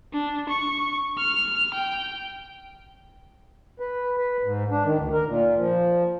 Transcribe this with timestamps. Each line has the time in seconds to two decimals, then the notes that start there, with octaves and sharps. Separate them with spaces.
0.13 D4
0.50 C#6
1.18 F6
1.75 G5
3.80 B4
4.18 B4
4.44 G#2
4.70 D4
4.85 D#3
4.98 D2
5.13 A#4
5.28 A#2
5.58 F3